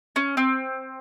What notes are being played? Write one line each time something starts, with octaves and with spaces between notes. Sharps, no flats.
C#4
C4